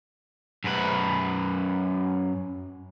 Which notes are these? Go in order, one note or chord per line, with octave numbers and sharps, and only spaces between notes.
F#2 B4